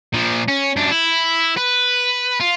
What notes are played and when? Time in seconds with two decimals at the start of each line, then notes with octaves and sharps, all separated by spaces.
0.14 A#2 F3
0.48 C#4
0.76 F#2 D4
0.91 E4
1.57 B4
2.40 F4